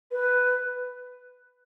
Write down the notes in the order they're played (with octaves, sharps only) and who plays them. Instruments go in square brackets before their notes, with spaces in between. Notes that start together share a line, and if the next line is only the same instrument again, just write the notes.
[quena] B4